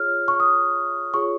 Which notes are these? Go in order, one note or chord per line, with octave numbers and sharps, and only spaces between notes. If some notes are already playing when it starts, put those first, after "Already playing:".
Already playing: F4 G#4 C#5 F6
C#6
D#6
F4 G#4 C#5 C#6